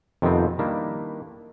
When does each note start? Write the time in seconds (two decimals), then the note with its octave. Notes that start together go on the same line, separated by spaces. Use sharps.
0.22 F2 C3 D#3 F3 B3 C4
0.59 D#3 G3 A#3 D4 E4